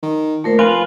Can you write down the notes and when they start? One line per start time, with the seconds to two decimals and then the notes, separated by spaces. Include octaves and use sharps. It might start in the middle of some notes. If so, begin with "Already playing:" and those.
0.02 D#3
0.44 A#2 A3 A#4 C5
0.59 F1 F4 B4 G#5